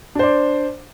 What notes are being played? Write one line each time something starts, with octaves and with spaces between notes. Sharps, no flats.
D4 C5 D5